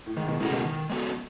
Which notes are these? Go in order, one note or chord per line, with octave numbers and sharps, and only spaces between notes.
A2
G#2 D#3
G#2 B2
A2 C#3 G#3 B3 F#4 A4
B2 D#3
D#3
G#3 B3 F#4 A4